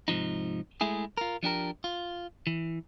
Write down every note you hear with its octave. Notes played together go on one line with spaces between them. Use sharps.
G#2 C3 F3 D#4
G#3 A3 E4 G#4
F4 A#4
F3 D4 G4 A#4
F4
E3